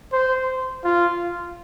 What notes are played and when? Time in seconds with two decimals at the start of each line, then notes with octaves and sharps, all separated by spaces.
0.13 C5
0.84 F4